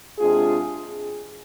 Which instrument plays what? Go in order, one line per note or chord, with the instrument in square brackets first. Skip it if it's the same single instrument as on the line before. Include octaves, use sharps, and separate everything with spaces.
[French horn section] C3 G#3 D4 F4 G#4